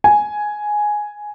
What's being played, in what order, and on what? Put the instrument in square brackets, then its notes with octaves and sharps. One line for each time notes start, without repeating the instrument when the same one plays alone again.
[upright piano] G#5